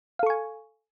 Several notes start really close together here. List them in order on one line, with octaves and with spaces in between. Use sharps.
F5 A4 C#6 G#5